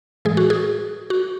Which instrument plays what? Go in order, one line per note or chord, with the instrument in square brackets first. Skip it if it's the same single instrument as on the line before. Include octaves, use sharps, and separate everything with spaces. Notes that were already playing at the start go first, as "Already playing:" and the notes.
[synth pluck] A2 E3 G#3 G#4
F#4
G#4
F#4